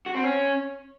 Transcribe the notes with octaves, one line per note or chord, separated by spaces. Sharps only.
F#4
C4
C#4